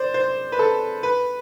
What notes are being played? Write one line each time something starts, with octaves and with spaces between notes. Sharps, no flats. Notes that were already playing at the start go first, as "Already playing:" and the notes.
Already playing: C5 D5
C5
B4
A4
B4